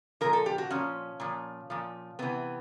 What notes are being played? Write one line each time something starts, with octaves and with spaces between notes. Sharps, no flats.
A#2 F3 A#4
A4
G4
F#4
A#2 F3 C#4
A#2 F3
A#2 F3
C3 E3 B3